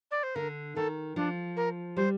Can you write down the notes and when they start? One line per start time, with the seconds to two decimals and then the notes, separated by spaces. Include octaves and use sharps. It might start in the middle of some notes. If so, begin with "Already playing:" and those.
0.11 D5
0.23 C5
0.35 D3 A#4
0.75 D#3 A4
1.16 F3 D4
1.57 A#4
1.97 G3 C5